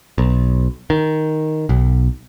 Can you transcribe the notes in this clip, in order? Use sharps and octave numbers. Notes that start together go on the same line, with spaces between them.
B1
D#3
B1